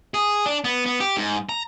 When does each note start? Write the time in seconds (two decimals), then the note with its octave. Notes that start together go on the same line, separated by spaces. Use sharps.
0.14 G#4
0.46 D4
0.64 B3
0.86 B3
1.00 G4
1.17 G#2
1.49 A#5